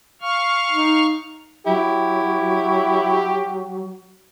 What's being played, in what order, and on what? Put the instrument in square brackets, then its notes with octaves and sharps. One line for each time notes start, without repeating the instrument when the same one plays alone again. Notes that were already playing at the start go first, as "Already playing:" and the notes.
[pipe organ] F5 C#6 F6
[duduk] D#4
[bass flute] F#3 [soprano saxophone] E4 [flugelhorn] G4